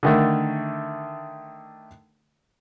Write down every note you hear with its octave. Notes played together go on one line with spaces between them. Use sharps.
D3 D#3 A3